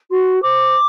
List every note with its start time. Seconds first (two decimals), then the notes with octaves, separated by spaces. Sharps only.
0.09 F#4 C6
0.42 C5 D6